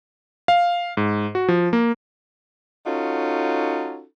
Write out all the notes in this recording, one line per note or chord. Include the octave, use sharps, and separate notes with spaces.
F5
G#2
F#4
F3
A#3
C#4 D#4 F4 F#4 A4